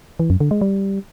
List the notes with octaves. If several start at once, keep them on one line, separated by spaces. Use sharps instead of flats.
E3
F#2
D3
G#3
G3